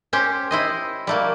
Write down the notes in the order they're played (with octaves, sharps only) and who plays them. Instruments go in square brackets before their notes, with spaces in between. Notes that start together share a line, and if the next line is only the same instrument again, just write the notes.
[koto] C#4 G4 C5
E4 C5 D#5
G3 A3 A#3